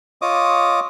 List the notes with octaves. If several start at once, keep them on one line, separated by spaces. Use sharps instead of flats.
F4 C#5 D#5 D6 D#6